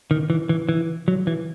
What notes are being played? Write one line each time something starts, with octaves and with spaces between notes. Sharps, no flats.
D#3
E3
E3
E3
F#3
E3